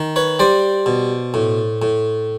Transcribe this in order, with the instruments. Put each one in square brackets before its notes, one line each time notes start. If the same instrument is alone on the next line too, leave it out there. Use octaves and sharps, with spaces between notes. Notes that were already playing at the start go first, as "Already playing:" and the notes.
Already playing: [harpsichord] D#3
B4 C#5
G3 C5 D5
B2
A2
A2